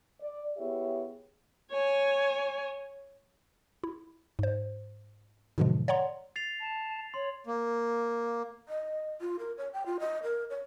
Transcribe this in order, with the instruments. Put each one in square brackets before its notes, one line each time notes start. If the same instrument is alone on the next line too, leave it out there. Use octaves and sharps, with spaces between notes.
[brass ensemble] D5
B3 E4 G4 G#4 C#5 E5
[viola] C#5 G#5
[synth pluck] E4
G#2 C5
G#2 B2 D3 E3 F3 G#3
C#5 D5 F#5 A#5 C6
[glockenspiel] A6 C7 F7
[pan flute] A5
[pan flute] C#5 [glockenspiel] C6
[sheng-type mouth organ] A#3
[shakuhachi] D#5
F4
A#4
C#5
G5
F4
D#5
A#4
C#5